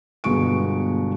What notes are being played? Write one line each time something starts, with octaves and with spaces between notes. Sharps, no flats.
G1 B2 G#3 C#6 D7